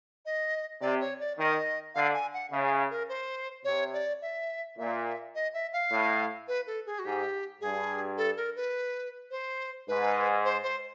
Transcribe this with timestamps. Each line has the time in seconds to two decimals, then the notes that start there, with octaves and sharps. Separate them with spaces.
0.26 D#5
0.81 C3 D5
1.00 C#5
1.20 D5
1.39 D#3 D#5
1.95 D3 F5
2.14 G#5
2.34 F#5
2.51 C#3 E5
2.65 F5
2.71 E5
2.90 A#4
3.09 C5
3.65 C3 C#5
3.93 D5
4.22 E5
4.78 A#2 E5
5.35 D#5
5.54 E5
5.73 F5
5.91 A2
6.48 B4
6.67 A4
6.86 G#4
6.99 F#4
7.05 G#2 G4
7.61 G2 G#4
8.18 A4
8.37 A#4
8.56 B4
9.31 C5
9.88 G#2 B4
10.45 C5
10.63 C5